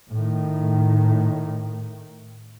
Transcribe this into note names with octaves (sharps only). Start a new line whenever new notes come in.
A2 D#3